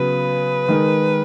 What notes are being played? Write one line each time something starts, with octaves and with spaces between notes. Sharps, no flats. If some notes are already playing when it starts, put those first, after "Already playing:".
Already playing: C#3 F#3 B3 B4
D#3 G#3 D#4 A#4